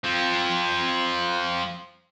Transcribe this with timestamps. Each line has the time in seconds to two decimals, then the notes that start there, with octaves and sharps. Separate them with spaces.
0.04 F3 C4